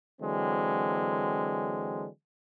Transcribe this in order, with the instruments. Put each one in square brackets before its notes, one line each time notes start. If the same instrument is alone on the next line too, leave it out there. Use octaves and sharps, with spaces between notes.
[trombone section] D3 E3 F#3 G#3 C4